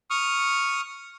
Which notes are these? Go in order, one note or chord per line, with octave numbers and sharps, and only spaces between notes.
C#6 D#6 F6